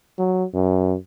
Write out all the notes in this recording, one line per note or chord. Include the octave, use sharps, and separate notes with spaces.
F#3
F#2